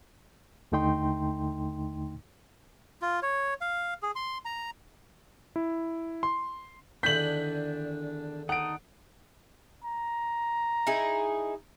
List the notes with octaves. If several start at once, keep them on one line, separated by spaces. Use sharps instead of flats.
D#2 D3 A3 D#4 G5 C6
F4
C#5
F5
G#4
C6
A#5
E4
C6
E2 D3 D#3 D4 G6 B6 F#7
D#4 A4 D#5 F#5 D7
A#5
D#4 E4 G#4